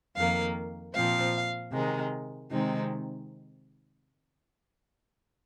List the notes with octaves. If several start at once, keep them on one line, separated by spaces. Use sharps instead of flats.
F2 D#3 A#3 F5
A#2 F3 C4 F5
C3 D#3 G#3
C3 D#3 G#3 C4 D#4